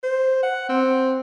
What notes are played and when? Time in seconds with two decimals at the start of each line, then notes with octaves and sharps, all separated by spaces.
0.03 C5
0.43 F#5
0.69 C4